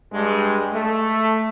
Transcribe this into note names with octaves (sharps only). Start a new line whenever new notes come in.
G2 G#3
A3